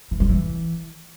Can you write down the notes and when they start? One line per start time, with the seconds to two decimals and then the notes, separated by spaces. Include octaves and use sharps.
0.11 E3
0.20 G3
0.29 E3